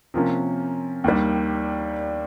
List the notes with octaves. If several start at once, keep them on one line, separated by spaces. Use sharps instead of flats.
C3 F3 A#3 C#4
D#2 D#3 G3